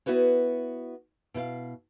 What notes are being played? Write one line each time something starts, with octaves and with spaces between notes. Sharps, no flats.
B3 E4 F#4 B4 C#5
B2 E4 C5 F5